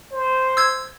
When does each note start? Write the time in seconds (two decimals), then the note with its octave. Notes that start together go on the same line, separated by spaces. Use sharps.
0.12 C5
0.57 E6 G#6